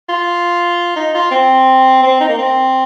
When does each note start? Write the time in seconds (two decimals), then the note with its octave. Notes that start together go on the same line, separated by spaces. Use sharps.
0.09 F4
0.96 D#4
1.15 F4
1.31 C4
2.03 C4
2.20 D#4
2.29 A#3
2.38 C4